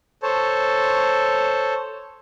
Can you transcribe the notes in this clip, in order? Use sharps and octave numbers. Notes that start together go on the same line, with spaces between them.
A4 C5 C#5 A5